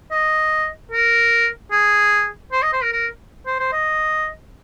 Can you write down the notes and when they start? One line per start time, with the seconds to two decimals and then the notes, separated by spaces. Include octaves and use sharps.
0.11 D#5
0.91 A#4
1.72 G#4
2.52 C5
2.62 D#5
2.73 C5
2.82 A#4
2.93 A#4
3.46 C5
3.59 C5
3.73 D#5